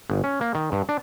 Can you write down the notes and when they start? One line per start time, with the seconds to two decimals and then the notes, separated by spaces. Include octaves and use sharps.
0.10 G1
0.24 C#4
0.41 A#3
0.55 D#3
0.72 G2
0.89 D4